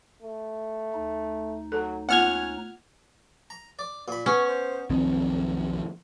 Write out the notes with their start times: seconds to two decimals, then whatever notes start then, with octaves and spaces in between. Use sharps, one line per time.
0.22 A3
0.94 D2 D#4
1.72 F#3 A4
2.09 A#3 B3 C#4 F4 F#5 F6 G#6
3.50 A#5
3.79 D5
4.08 A#2 B5
4.26 B3 C#4 C#6
4.48 C5
4.90 B1 F2 D#3 C4